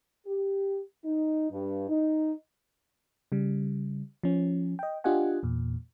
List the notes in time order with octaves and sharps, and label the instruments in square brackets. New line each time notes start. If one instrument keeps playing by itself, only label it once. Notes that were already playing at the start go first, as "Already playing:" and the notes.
[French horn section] G4
D#4
G2
D#4
[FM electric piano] C#3 G3
F3 C#4
D#5 G5
D4 F4 G4 D#5 F#5 G#5
E2 A#2